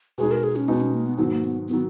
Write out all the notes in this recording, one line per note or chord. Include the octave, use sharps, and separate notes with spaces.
B2 G#3 D#4 G#4
A#4
G#4
C#4
B2 G#3 B3 D#4
C#4
A#3
B3
G#2 D#3 F#3 B3
A#3
B3
D#3 F#3 B3